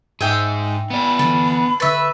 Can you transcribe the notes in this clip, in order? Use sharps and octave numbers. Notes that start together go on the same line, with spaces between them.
G#2 D#4 G#4 E5 G5
B3 D5 B5
D3 E3 D4
D3 B4 E5 C#6 A6